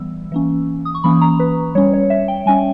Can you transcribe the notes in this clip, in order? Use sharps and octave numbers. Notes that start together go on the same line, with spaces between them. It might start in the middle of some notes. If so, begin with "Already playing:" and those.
Already playing: E3 G3 B3 E6
E3 A#3 C#4
D#6
C#6
E3 A#3 C#4 B5
A#5
B4
G3 C#4 C#5
C#5
E5
G5
G3 C#4 G#5